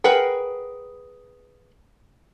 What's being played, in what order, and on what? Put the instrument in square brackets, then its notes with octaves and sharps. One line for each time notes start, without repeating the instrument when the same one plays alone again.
[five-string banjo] G#4 A#4 B4 F#5 G5